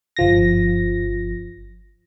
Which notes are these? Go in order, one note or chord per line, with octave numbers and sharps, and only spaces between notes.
G1 F3 A#6